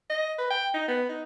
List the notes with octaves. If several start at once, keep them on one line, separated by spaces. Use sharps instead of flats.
D#5
B4
G5
D#4
B3
D#4